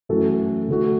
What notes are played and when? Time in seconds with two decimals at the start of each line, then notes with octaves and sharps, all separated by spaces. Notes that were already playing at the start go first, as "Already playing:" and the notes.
0.09 F#2 E3 A3 F#4 A4
0.69 D3 A3 F#4